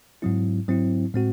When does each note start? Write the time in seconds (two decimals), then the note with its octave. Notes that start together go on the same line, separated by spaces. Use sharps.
0.22 G#2 F#3 C4 E4
0.68 G#2 F#3 C4 E4
1.14 A2 G#3 C4 F#4